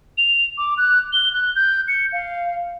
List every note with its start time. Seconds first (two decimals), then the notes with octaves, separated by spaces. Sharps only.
0.18 F7
0.58 D6
0.78 F#6
1.13 G7
1.33 F#6
1.56 G6
1.88 C#7
2.13 F5